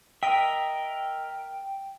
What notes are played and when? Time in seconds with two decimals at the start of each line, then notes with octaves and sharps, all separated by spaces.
0.23 A#4 D#5 E5 G5